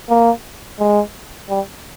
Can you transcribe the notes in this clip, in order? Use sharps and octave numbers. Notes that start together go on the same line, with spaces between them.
A#3
G#3
G3